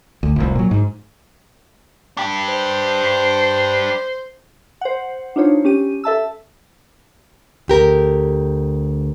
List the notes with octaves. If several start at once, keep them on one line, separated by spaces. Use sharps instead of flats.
D2
F1 C2
A#2 F#3
G#2
D4 G4
C5
C5 F#5
D4 D#4 F4 C5 C#5
C#4 G4 D#7
A4 E5 A5 E6
D2 G4 A#4